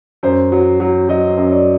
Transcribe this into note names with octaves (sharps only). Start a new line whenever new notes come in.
F#2 C5
F#3
F#3
F#3 D#5
F#2
D5